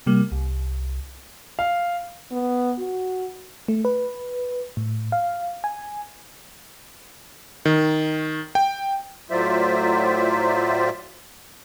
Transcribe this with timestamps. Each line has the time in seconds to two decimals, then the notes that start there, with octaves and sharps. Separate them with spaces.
0.06 C3 G3 A#3
0.32 C2
1.59 F5
2.32 B3
2.78 F#4
3.68 A3
3.85 B4
4.77 A2
5.12 F5
5.64 G#5
7.65 D#3
8.55 G5
9.31 A2 F#3 F4 C5 D5 E5